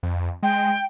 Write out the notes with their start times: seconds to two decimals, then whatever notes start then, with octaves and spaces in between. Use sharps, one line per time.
0.03 F2
0.43 G#3 G5